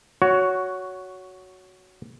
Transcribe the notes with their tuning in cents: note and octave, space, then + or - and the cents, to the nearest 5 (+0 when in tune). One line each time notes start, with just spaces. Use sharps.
F#4 +0 C#5 +15